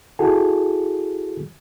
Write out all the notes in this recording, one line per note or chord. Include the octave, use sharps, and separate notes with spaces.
E4 F#4 G#4 A4